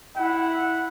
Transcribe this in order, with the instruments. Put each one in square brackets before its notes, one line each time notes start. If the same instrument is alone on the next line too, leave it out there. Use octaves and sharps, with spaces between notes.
[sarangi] E4 [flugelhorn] F#5